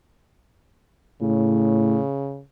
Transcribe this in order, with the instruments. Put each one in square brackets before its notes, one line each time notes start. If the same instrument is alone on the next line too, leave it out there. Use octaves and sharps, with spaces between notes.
[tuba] A2 [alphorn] C#3